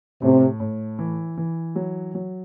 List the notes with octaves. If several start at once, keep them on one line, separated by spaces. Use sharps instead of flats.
A2 C3
A2
E3
E3
F#3
F#3